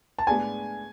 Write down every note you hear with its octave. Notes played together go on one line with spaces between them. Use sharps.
A5
A2 G#3 B3 D4 G#4 G#5